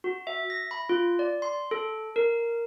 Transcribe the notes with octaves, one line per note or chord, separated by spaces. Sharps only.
F#4
E5
A#6
B5
F4
D5
C6
A4
A#4